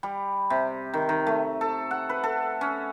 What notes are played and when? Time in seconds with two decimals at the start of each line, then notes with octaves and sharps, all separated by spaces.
0.03 G3
0.50 C3
0.94 D#3
1.09 D#3
1.27 A3
1.61 A4
1.91 F#5
2.09 B4
2.24 A4
2.61 C#4